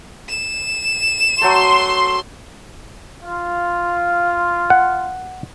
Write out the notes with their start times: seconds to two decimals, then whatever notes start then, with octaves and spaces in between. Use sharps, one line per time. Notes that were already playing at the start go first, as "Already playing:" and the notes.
0.28 E7
1.41 F#3 A3 A4 C6
3.23 F4
4.70 F#5